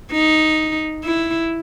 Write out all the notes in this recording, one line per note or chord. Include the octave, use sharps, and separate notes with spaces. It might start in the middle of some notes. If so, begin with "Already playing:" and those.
D#4
E4